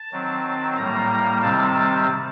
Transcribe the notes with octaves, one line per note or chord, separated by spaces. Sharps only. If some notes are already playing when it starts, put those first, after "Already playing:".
Already playing: A5
D#3 F#3 C4
A2 G3 A#3 A#5
C3 D#3 G3 C4 A5